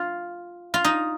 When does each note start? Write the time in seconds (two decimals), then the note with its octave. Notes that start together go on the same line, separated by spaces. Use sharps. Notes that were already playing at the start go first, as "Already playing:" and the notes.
Already playing: F4
0.74 F4
0.85 D#4